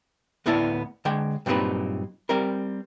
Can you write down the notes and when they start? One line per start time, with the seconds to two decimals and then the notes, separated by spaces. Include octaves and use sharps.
0.46 D2 A2 B3 E4 D5 A5
1.05 D3 G#3 G5
1.46 G2 A#2 F#3 C4 D#4 B4
2.29 G3 C4 A#4